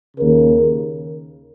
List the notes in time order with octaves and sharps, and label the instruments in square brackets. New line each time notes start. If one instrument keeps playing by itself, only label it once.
[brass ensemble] D#2 C#3 A#4